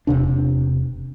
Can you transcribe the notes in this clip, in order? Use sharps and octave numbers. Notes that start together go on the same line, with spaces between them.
E1 C2 C3 D4